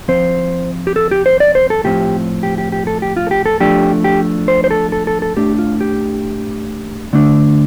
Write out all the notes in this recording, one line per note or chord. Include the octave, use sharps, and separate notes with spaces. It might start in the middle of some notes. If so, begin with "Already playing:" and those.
F3 C4 C5
G4
A4
G4
C5
D5
C5
A4
A2 F3 C4 G4
G4
G4
G4
A4
G4
F4
A4
G4
A4
F3 A3 D4 G4
G4
C5
C5
A4
A4
A4
A4
A2 A3 D4 G4
F4
G4
D3 A3 D4